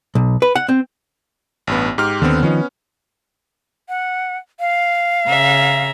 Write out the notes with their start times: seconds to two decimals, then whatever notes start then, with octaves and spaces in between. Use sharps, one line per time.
0.15 B1
0.42 B4
0.55 F#5
0.69 C4
1.67 A1 G2 B3
1.98 G#2 G4 F6
2.22 D#2 D3 B3 C4
2.43 D#3 F3 B3 C#4 D#4
3.89 F#5
4.60 F5
5.27 C#3 E5 A#5